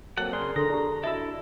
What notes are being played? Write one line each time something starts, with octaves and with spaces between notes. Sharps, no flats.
F#3 A#3 C4 A4 F#5
C#3 G#4 A#4 D5 C6
D3 A4 A#5 C6
D4 E4 G4
E4 F#4 A4 D#5 E5 B5 E6